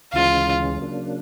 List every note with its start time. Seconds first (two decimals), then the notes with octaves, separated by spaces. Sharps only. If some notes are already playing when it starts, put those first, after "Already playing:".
0.13 D2 C#3 E3 G#3 C#4 F4
0.79 C#3 F#3 A#3 D4